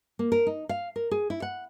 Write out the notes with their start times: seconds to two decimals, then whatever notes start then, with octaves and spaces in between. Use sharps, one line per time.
0.19 A#3
0.32 A#4
0.47 D#4
0.69 F5
0.96 A#4
1.11 G#4
1.30 E4
1.42 F#5